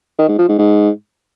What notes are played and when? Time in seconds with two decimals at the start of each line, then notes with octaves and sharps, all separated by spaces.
0.18 D#3
0.28 G#2
0.38 F3
0.49 G#2
0.59 G#2